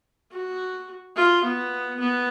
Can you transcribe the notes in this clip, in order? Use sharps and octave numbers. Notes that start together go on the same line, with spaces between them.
F#4
F4
B3
B3